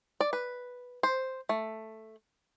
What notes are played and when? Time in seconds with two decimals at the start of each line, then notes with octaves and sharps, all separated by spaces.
0.21 D5
0.33 B4
1.03 C5
1.49 A3